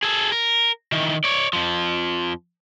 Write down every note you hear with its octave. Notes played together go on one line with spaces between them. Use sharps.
G#4 A4
A#4
D#3 E3
C#5 D5
F2 F3